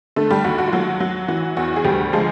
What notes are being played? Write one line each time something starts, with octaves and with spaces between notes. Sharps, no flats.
D3 A3 A4
G3 G4
D#2 F#4
F#4
F4
F#3 F#4
F#3 F#4
E3 F#4
E2 F#4
G#4
D2 G3 G4
F3 G#3 G#4